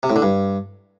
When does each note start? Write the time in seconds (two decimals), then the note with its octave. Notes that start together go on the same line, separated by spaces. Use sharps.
0.03 C3
0.10 A2
0.16 D3
0.22 G2